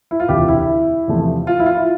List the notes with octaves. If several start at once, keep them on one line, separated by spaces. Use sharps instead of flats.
E4
F4
E1 D2 C3 G4
E4
E2 C3 F3 A3
F4
E4
F4